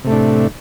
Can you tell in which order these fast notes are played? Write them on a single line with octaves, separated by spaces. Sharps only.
C3 A3 A2 D4